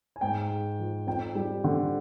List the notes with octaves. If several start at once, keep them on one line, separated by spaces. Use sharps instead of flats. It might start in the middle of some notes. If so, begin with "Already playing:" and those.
G#5
G#2 G5
G#3
F3
F2 G5
G3
D3